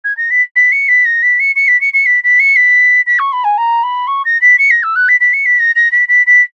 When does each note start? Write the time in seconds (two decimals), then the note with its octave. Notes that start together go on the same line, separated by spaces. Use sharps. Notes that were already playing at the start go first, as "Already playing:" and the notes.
0.04 G#6
0.17 A#6
0.30 B6
0.56 B6
0.72 C#7
0.88 B6
1.05 A#6
1.22 B6
1.39 C#7
1.56 C#7
1.68 B6
1.81 C#7
1.93 C#7
2.06 B6
2.23 B6
2.39 C#7
2.56 B6
3.06 B6
3.19 C#6
3.32 B5
3.44 G#5
3.57 A#5
3.83 B5
4.07 C#6
4.25 A#6
4.41 B6
4.58 C#7
4.70 A#6
4.83 E6
4.95 F#6
5.08 B6
5.20 B6
5.33 C#7
5.45 B6
5.59 A#6
5.75 A#6
5.91 B6
6.08 B6
6.26 B6